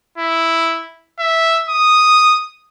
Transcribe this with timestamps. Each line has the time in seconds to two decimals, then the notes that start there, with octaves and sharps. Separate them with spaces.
0.18 E4
1.19 E5
1.69 D#6